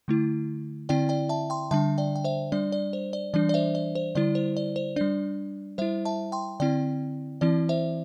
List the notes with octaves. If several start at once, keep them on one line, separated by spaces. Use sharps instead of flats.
D3 A3 E4
D3 C4 E4 D5 G5
D5 G5
E5 A5
G5 C6
D3 G3 D4 E5 A5
D5 G5
G5
C5 E5
G3 D4 D5
D5
C5
D5
E3 G3 D4 D5
D5
C5 E5
D5
C5
D3 G3 E4 D5
C5
D5
C5
G3 D4 D5
G3 E4 C5 E5
E5 A5
G5 C6
D3 C4 E4 D5 G5
E3 C4 E4 D5
C5 E5